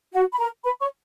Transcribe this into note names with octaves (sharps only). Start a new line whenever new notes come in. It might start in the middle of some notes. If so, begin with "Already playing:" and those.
F#4 F#5
B5
A#4 A#5
B4 B5
C#5 C#6